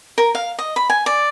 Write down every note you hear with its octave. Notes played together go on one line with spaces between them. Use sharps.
A#4
F5
D#5
B5
G#5
D5